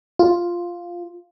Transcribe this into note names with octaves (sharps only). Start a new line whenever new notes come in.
F4